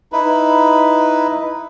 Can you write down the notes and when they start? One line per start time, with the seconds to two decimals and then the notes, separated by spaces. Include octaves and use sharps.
0.12 D#4 E4 B4